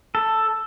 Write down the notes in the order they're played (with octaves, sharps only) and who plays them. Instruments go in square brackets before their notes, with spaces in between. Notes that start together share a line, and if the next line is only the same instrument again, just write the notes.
[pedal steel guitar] A4